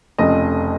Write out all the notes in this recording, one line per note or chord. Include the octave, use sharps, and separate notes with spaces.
F1 F2 C#3 D#5